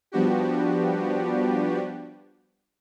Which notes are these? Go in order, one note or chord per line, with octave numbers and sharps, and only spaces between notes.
F3 G3 B3 D4 F#4 G4